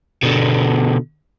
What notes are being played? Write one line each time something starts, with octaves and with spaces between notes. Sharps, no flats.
B2 D3